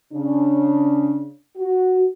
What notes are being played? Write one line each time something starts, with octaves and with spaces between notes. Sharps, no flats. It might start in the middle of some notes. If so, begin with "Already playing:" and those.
C#3 D4
F#4